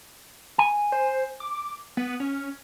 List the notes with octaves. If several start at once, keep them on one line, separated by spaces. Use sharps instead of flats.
G#5
C5
D6
B3
C#4